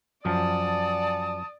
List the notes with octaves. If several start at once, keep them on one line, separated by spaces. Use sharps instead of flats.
F#2 F3 D5 F#5 G#5 A5 D#6